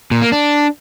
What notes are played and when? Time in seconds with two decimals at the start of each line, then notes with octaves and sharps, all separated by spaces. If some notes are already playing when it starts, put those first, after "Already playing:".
0.11 A#2
0.22 A#3
0.32 D4